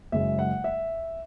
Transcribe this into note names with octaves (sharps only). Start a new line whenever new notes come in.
F#1 F#2 C#3 G#3 E5
F#5
E5